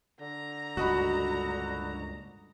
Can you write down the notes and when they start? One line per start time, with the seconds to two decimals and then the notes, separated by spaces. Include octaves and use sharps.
0.21 D3 A#5
0.77 C#2 G2 A#2 F#4 D#5 B5